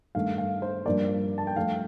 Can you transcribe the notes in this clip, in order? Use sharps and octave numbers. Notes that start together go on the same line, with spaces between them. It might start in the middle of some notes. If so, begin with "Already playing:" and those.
G2 D#3 A3 F5
F5
C5
G2 F3 A#3 D5
A5
G5
G2 F3 A3 F5